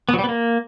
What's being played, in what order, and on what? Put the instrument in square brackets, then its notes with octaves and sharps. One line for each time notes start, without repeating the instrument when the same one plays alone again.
[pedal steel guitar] B3
F#3
G3
B3
A#3